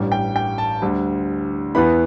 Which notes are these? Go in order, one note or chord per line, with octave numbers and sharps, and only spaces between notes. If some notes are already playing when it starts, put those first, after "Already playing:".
Already playing: A1 G2 G3
G5
G5
A5
D2 D3 G3
E2 E3 B3 E4 B5